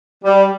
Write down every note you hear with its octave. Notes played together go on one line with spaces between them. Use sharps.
G3